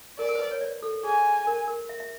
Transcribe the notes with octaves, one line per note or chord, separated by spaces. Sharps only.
A#4 D5
A#4
C5
B4
C#5
D5
A4
G#4 G#5
A#4
A#4
E5
E5